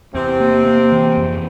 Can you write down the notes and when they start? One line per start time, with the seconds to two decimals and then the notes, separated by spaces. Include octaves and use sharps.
0.14 E2 C3 C4
0.40 A#3
0.66 A#3
0.92 E3
1.17 F2